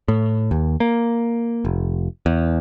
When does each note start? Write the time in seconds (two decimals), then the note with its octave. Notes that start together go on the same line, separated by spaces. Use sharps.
0.08 A2
0.51 D#2
0.80 A#3
1.65 F1
2.26 E2